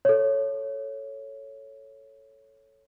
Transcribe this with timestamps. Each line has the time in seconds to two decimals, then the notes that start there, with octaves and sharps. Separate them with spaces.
0.05 A4 C#5